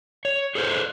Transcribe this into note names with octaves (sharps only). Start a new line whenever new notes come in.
C#5
G#4 A4 B4 C5